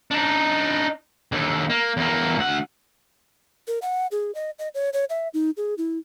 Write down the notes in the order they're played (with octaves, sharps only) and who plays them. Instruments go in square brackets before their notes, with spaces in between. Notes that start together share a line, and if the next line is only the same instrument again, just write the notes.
[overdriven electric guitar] D4 D#4
D#2 D3
A#3
E2 A#3
D2 F#5
[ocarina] A#4
F#5
G#4
D#5
D#5
C#5
C#5
E5
D#4
G#4
E4